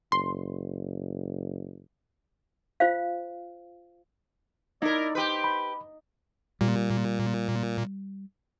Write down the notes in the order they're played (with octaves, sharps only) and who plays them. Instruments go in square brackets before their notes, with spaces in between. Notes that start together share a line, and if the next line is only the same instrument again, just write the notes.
[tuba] F#1 [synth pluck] C6
[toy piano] F4 C5 F5
[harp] D#4 [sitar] E4 A#4 [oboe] D5
[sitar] G4 B4 [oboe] C5
[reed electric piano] B5
[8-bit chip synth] A#2 [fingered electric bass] G3